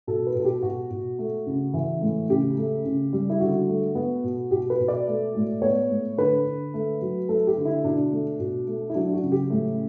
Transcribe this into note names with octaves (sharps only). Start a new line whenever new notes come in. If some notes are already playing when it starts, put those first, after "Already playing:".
B2 A4
B4
B2 A4
G4
B2 F#4
B2
A3
C#3
E3
A2
C#3 G4
A3
C#3
G3
E4
D3 F#4
A3
B3
B2
B2 G4
B4
B2
D5
A3
A2
B3 C#5
A2
D3 B4
D3
A3
F#3
A3 A4
G4
D3
E4
B2 D4
A3
B2
A3
E4
F#3 D4
F#4
C#3
G4
A2